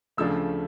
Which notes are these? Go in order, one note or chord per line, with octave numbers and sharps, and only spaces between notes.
D2 C#3 F3 A3 D4 E6